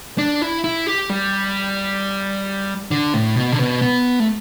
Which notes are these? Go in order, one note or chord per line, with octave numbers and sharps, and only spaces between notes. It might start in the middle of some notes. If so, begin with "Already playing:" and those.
D4
E4
E4
G4
G3
D3
A2
B2
D3
B2
B3
A3